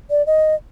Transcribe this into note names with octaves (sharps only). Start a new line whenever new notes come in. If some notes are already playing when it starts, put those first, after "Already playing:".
D5
D#5